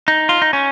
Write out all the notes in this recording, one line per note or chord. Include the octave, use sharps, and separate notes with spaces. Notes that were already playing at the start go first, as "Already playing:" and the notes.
D#4
F4
D#4
C#4